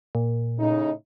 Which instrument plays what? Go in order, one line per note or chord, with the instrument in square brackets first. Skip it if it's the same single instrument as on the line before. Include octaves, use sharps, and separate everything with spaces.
[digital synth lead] A#2
[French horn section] A2 C#3 D#4